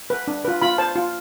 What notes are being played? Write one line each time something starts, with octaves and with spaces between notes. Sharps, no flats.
B4
D4
F4 B4
F4 B5
C5 A5
F4